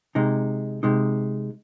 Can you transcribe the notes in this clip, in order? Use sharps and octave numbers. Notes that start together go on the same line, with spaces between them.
C3 G#3 D#4
C3 G#3 D#4